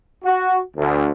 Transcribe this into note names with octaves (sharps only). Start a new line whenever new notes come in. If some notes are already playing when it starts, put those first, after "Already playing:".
F#4
D2